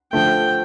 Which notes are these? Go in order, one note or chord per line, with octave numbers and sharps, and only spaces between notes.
D3 F3 A3 G5